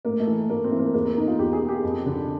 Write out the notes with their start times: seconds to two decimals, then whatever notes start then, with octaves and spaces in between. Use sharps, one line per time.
0.05 A2 A#3
0.20 A3
0.27 E3
0.50 A2 A#3
0.64 C4
0.72 E3
0.79 A#3
0.94 E2 A#3
1.05 A#3
1.17 B2 D#4
1.28 F4
1.39 E2 G4
1.53 G#4
1.61 B2
1.68 G4
1.83 F2
2.06 D3